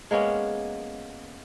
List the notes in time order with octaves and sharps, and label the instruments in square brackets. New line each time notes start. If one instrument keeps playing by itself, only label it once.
[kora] G#3 A#3 B3 C#4